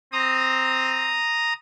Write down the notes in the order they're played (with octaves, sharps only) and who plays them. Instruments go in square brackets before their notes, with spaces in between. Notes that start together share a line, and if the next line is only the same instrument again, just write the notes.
[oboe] C4 [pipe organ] A#5 D#6